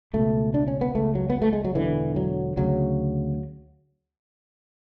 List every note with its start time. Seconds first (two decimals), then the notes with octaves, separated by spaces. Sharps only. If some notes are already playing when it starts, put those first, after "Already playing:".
0.13 C#2 B2 A3
0.54 D4
0.68 C#4
0.81 B3
0.95 C#2 C#3 A3
1.15 F#3
1.30 B3
1.42 A3
1.53 G#3
1.64 F#3
1.75 E1 E2 D3 E3
2.16 F#3
2.57 D2 C#3 F#3